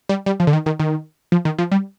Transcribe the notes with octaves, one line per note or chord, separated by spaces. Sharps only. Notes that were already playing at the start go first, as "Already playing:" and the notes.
G3
G3
F3
D3
D#3
D#3
D#3
F3
D#3
F3
G3